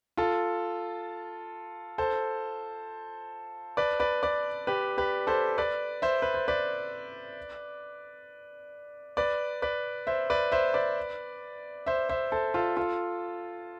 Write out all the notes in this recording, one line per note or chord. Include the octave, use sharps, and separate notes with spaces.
F4 A4
A4 C5
B4 D5
B4 D5
B4 D5
G4 B4
G4 B4
A4 C5
B4 D5
C5 E5
B4
C5
B4 D5
B4 D5
B4 D5
C5 E5
B4 D5
C5 E5
B4 D5
C5 E5
C5 E5
A4 C5
F4 A4
F4 A4